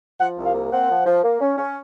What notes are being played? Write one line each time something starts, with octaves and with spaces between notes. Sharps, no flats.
F3 F#5
C2
F5
A#3
C4 F#5
F3
F3
A#3
C#4
C#4